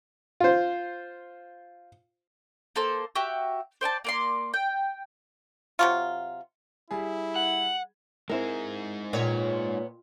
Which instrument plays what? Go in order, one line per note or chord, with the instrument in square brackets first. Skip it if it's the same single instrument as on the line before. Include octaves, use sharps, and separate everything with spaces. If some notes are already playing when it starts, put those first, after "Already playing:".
[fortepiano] F4 C5
[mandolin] A#3 A4 C5
F#4 G4 E5
C5 D5 G#5 A5
A#3 D5 C6
G5
[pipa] C3 F#3 F4
[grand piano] G3 G#4 [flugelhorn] E4
[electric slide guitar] F#5 [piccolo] F#7
[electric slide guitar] G#3 D#4 G#4 [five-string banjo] C4 E4 A#4
[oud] A#2 [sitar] B3 C#5